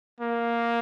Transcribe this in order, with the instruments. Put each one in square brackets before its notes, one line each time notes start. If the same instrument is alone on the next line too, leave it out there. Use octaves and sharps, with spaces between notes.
[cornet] A#3